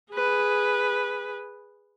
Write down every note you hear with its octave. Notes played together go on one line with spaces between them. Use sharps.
G#4 B4